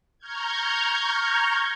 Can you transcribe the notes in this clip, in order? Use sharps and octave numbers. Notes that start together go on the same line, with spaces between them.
A#5 C#6 F6 G6 G#6